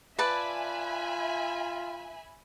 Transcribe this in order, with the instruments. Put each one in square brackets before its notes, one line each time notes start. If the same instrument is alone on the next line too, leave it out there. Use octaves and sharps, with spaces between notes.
[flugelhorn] F4 [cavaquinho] B4 D5 A5 [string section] E5 G#5 B5